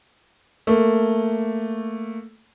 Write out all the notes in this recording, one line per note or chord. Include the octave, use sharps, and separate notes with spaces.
A3 A#3